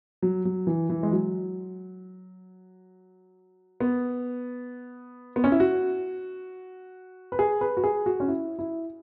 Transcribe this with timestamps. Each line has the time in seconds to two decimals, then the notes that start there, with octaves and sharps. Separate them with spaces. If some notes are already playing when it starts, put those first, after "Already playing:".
0.22 F#3
0.45 F#3
0.67 E3
0.90 E3
1.03 G#3
1.12 F#3
3.80 B3
5.36 B3
5.44 C#4
5.52 E4
5.60 F#4
7.32 B4
7.39 G#4
7.61 B4
7.77 F#4
7.84 G#4
8.06 F#4
8.20 C#4
8.28 E4
8.59 E4